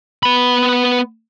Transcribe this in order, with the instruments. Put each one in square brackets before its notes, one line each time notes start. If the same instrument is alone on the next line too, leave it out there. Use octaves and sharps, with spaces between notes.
[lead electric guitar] B3 B5